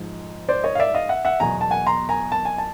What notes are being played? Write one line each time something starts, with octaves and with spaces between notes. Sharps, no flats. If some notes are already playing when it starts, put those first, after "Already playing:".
Already playing: G#2 F3
C5 D5
C#5 D#5
F5
D5 E5
D#5 F5
E5 F#5
E5 F#5
E2 B2 F#3 G#5 A#5
A5
F#5 G#5
A#5 C6
G#5 A#5
A5
G#5
A5